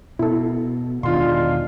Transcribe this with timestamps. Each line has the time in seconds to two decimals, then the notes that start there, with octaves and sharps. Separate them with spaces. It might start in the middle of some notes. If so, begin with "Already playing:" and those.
0.19 B2 E4 A4
1.03 E1 B2 D#3 G#3 D4 F4 F5 C6